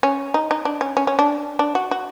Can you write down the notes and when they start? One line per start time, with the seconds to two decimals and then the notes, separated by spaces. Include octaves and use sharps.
0.03 C#4
0.34 D#4
0.51 D#4
0.65 D4
0.81 C#4
0.97 C#4
1.07 C#4
1.19 D4
1.59 D4
1.75 F#4
1.91 F#4